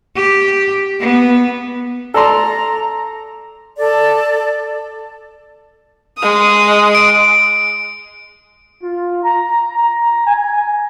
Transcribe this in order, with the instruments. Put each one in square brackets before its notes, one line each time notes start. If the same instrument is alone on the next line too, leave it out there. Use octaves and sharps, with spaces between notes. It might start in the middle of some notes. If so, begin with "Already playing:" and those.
[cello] G4
B3
[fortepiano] A4 D5 C6 [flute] A#5
[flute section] A4 D5
[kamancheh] G#3 D#6
[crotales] D7
[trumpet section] F4
A#5
A#5
G#5